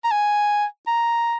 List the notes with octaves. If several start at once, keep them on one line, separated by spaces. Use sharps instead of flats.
A#5
G#5
A#5